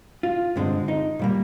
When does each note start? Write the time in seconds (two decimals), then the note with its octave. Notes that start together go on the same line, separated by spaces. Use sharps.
0.23 F4
0.56 G2 D3 G#3 C4
0.88 D#4
1.19 A#2 G3 A#3